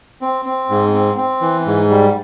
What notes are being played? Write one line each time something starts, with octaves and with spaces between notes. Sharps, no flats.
C4
C4
G#2
C4
C4
E3
G#2
G3